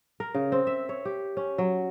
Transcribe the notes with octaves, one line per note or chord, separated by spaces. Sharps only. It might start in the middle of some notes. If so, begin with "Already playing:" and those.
A#4
C#3
C4
E5
C#5
G4
C#4
F#3